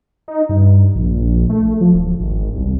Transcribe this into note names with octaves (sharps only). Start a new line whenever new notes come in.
D#4
G2
A#1
A3
F3
D1
G#1
C2